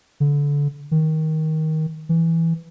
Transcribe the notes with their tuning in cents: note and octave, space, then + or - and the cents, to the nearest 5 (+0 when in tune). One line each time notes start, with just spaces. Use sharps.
D3 -25
D#3 +15
E3 +0